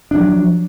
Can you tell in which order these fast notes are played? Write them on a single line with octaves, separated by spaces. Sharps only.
D4 F#3 F3